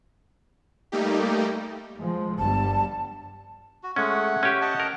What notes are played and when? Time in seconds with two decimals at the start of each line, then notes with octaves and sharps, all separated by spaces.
0.92 G3 A3 A#3 D#4 G4
1.98 F3 G#3
2.38 G1 G3 A5
3.83 F#4
3.96 G#3 A3 C#4 F#5
4.43 C#4 G4
4.61 D#5 F#5 A5
4.80 A#4